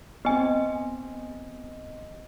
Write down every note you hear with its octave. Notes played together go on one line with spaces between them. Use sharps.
B3 C4 D#5 G#5